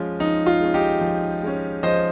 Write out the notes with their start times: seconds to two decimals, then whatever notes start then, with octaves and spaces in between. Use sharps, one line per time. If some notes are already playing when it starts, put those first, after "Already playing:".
Already playing: F3 G#3 C#4 F4
0.20 F3 D#4
0.46 F4
0.60 G#3 C#4
0.74 D#4 G4
1.01 F3
1.43 G#3 C#4
1.83 F3 C5 D#5